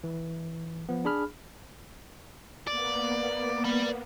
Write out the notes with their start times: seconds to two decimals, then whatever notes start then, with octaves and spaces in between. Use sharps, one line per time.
0.04 E3
0.89 F3 B3
1.05 D4 G#4 B5 F6
2.67 A#3 B3 D5
3.65 D5 B5